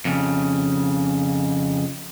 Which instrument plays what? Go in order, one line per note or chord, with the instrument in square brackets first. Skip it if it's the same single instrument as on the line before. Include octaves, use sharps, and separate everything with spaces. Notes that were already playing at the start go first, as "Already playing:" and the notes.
[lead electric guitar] F2 C#3